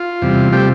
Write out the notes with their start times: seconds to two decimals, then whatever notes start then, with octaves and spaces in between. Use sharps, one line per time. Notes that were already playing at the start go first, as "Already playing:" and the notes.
Already playing: F4
0.22 E2 C3 G3
0.52 C3 F3 G3 A3 G4